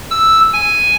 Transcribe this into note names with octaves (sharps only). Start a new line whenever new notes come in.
E6
G#5